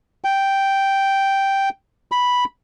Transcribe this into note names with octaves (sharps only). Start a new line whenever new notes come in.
G5
B5